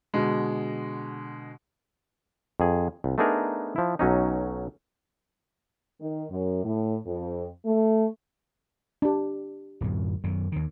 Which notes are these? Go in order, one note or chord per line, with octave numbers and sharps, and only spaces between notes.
B2 D3 G#3
F2 G#4
C2
A3 B3 D4 D#4 G#4 A#4
F3 E4
B1 F#3 C#4 D#4
D#3
F#2
A2
F2
A3
D4 G4
D1 F#2
F#2 D#3
D#2 D#3